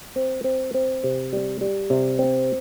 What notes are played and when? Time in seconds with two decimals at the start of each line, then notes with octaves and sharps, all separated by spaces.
0.16 C4
0.44 C4
0.74 C4
1.04 C3
1.33 G3
1.61 G3
1.90 C3
2.19 C4